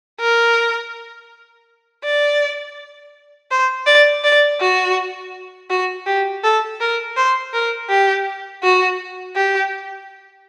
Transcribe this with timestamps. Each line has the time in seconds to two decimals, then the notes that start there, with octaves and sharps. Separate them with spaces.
0.20 A#4
2.04 D5
3.51 C5
3.86 D5
4.24 D5
4.60 F#4
5.70 F#4
6.07 G4
6.44 A4
6.80 A#4
7.17 C5
7.53 A#4
7.89 G4
8.63 F#4
9.36 G4